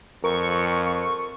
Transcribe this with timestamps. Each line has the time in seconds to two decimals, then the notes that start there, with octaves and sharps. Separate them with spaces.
0.24 F2 A#4 C#6